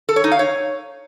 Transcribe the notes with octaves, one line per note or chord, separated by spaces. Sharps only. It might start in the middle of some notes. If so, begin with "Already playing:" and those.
A4
C#5
D#4
F5
C#5